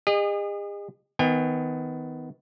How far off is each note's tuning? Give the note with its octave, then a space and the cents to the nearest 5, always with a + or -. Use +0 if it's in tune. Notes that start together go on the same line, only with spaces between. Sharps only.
G#4 -45 D#5 -25
D#3 +30 B3 +25 G#5 -45